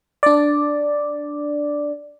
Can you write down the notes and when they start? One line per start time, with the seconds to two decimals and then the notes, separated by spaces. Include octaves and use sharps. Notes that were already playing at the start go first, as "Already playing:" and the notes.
0.23 D4 D5